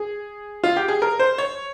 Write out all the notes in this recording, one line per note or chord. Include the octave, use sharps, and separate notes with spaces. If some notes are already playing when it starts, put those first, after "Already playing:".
Already playing: G#4
F4
G4
G#4
A#4
C5
C#5